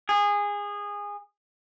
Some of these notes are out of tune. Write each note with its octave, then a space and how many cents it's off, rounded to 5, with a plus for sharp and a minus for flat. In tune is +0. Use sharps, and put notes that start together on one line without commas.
G#4 -20